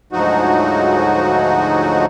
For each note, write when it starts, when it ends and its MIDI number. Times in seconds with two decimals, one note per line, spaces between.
0.12 2.06 38
0.12 2.06 44
0.12 2.06 53
0.12 2.06 54
0.12 2.06 63
0.12 2.06 66